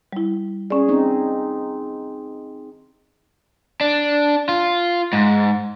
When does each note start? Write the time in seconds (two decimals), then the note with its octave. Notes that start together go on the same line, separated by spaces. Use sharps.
0.13 G3 E4
0.70 C#4 G#4 D5
0.89 C4 D#4
3.81 D4
4.49 F4
5.13 G#2